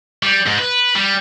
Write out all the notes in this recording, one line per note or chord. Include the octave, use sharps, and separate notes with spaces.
G3
G#2
B4
G3